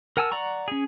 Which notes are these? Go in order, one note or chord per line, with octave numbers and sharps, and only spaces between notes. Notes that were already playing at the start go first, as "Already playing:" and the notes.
A#4 F#5 G#5 A5 E6
D5 F#5 A#5 C#6
C#4 G#4